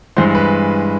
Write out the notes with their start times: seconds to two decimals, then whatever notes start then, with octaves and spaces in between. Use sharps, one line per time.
0.17 G2 E3 G#3 C5
0.35 B4